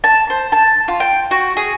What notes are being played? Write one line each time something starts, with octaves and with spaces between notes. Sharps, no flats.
A5
C5
A5
F4
G5
F#4
G#4